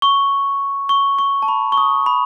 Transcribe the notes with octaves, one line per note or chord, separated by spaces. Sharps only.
C#6
C#6
C#6
A5
B5
C#6
D#6
B5